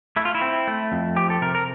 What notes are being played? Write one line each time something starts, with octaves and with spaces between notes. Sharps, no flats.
A3 E4
F4
E4
C4
A3
F2
F3 G4
A4
C3 A#4
A#4